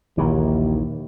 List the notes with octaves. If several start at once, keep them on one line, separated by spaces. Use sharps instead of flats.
A#1 D#2 D#3 E3